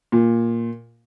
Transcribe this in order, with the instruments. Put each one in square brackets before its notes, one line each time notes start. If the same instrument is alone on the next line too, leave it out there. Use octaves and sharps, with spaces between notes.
[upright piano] A#2